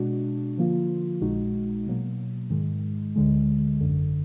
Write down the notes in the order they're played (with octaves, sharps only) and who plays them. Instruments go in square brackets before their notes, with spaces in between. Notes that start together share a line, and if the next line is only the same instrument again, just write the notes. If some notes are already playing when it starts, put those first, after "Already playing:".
Already playing: [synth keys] B2 G#3 D4 F#4
D3 F3 A#3 F4
A#1 A#2 G#3 D#4 F#4
B2 F#3 A#3
G#2 D#3 G#3
D2 D3 G#3
G#1 F#2 D3